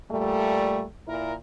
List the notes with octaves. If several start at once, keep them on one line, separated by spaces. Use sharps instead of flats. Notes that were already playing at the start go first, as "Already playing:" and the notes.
A#2 G3 A3
A#2 E4 A#4